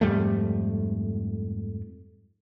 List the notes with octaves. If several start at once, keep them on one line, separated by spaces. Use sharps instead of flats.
F2 G#2 G3 A3